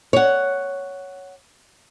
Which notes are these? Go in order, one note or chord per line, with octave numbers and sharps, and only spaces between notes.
C#5 F#5